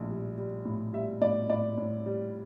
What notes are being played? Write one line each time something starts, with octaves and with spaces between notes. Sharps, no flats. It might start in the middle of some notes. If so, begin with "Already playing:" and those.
Already playing: A#1 A2
G3
G3
A2
G3 E5
A2 D5
A2 D5
A2
G3